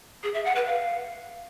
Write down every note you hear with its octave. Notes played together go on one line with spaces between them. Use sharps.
G#4
E5
F#5
B4
F5